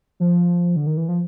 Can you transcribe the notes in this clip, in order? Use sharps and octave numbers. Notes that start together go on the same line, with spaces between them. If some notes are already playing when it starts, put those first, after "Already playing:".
F3
D3
D#3
E3
F3